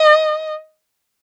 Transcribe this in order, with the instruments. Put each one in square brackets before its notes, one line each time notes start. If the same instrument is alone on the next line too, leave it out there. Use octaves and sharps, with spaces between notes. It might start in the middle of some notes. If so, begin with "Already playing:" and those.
Already playing: [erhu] D#5